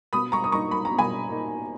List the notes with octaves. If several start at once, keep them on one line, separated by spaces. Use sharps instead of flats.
B2 B5 D#6
A#5 C#6
D#6
A#3 D#4 A#5 C#6
B5
A#5
B2
G#5 B5
A#3 D#4